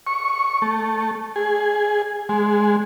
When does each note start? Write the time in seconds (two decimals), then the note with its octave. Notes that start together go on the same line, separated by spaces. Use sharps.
0.07 C#6
0.62 A3
1.36 G#4
2.29 G#3